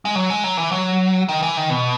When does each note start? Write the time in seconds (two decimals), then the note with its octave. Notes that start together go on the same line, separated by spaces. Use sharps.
0.05 G#3
0.15 F#3
0.30 G#3
0.44 F#3
0.57 E3
0.72 F#3
1.29 D#3
1.42 E3
1.57 D#3
1.70 B2